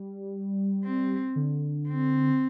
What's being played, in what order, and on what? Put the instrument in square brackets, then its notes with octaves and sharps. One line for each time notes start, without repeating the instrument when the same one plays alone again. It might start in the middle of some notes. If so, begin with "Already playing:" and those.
Already playing: [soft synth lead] G3
[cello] C4
[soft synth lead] D3
[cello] C4